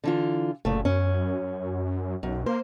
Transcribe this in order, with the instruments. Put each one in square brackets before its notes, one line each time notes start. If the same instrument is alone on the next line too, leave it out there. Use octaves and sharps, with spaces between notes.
[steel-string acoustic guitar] D3 E3 F4
[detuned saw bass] F#1 [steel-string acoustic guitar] A#2 C#3 A3
[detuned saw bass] F#2 [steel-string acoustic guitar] C#4
[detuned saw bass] B1 [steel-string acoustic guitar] F#2
[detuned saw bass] A#3 [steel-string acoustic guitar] C5